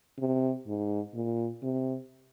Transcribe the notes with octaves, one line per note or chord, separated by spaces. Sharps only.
C3
G#2
A#2
C3